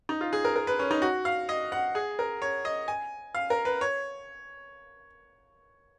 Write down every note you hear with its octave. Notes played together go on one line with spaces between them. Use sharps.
D#4
F4
G#4
A#4
A#4
B4
C#4
D#4
F#4
F5
D#5
F#5
G#4
A#4
C#5
D#5
G#5
F5
A#4
B4
C#5